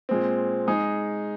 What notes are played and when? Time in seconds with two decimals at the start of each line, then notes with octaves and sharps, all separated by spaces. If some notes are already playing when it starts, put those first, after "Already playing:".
0.09 A#2 G#3 C4
0.67 G#3 D#4 G#4